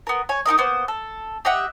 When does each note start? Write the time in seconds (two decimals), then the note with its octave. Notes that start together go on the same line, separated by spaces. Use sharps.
0.07 B3 A#4
0.29 C#5 G#5
0.46 D#4 E4 A#4 D#5
0.58 A#3 B3 C5
0.88 A4
1.45 G4 D#5 E5 F#5